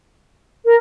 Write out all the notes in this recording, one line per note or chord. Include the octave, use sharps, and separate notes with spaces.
A#4